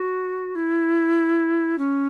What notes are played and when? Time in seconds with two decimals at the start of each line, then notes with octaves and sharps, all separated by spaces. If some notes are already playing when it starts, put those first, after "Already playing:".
Already playing: F#4
0.55 E4
1.78 C#4